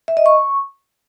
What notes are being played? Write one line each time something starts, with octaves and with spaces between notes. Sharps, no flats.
E5
D#5
C#6